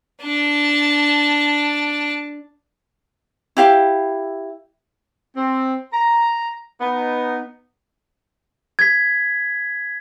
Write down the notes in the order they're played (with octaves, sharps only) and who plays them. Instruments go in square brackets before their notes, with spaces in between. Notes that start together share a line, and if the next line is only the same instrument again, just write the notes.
[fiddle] D4 A5
[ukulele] E4 G4 F5
[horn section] C4
A#5
B3 D#4
[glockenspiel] G#6 B6